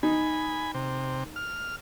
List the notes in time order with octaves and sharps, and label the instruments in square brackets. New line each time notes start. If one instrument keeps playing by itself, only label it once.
[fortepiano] D#4 [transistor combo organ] G#5 B5
[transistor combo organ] C3
F6